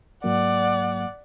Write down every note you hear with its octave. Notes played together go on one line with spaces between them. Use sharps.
G#2 F#3 A#3 D5 F#5